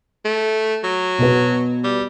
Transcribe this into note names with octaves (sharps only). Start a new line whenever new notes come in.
A3
F#3
B2 B3
G3